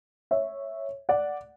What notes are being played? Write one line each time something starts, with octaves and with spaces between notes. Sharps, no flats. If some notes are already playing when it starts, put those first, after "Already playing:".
C#5 E5
D5 F#5